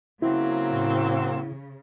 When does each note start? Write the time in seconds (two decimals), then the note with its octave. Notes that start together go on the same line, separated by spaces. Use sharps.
0.22 C#3 F#3 A#3 C4 E4
0.69 A2